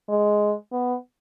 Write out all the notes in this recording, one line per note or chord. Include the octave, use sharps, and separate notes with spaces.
G#3
B3